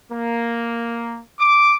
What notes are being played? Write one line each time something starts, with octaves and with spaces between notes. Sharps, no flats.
A#3
D6